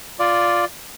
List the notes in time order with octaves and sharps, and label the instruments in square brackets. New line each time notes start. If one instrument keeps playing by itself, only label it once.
[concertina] F4 D5